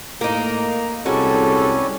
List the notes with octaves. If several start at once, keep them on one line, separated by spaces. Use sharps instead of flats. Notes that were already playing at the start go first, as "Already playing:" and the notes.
A2 A#3 D#4 A#5
C2 G3 G#3 C#4 F#4 A4